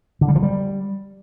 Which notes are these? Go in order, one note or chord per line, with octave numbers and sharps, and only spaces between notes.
D3
G3
F3
G3